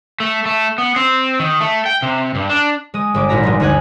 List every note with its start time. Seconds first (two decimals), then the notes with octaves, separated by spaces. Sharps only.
0.20 A3
0.46 A3
0.78 B3
0.96 C4
1.39 D#3
1.61 A3
1.86 G5
2.02 C3
2.35 G2
2.49 D4
2.94 G#3 D#6
3.14 G1 G#3 D6
3.29 G#1 A#2 E4 F#4 A#5 B6
3.43 F1 G3 G#3
3.60 G1 D2 D#4 G#5 F#6 G#6